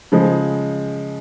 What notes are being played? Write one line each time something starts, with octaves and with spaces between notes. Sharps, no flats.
C#3 F3 G#3